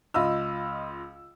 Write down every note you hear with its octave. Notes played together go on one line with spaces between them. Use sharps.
C#2 F4 D#5 B5 E6